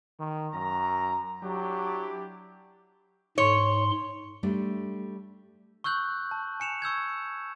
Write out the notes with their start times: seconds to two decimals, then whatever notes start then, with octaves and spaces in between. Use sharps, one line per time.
0.20 D#3
0.54 F#2 A#5
1.43 F#3 D4 E4 G4
3.38 G#2 C#5 C6
4.43 G3 A3 D4
5.84 C#6 E6 F#6 G6 F#7
6.31 A5
6.60 G#5 C#7 E7 F7
6.82 C#6 E6 G6 G#6